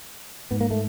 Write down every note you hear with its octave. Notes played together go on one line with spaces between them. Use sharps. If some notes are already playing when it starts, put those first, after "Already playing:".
G#2 B3
A#3
A3